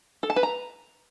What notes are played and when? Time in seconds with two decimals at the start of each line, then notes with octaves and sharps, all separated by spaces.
0.23 A4
0.30 A5
0.36 B4
0.43 A#5